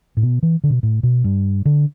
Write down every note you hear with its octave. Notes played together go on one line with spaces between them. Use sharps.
A2
B2
E3
D3
B2
A2
B2
G2
D3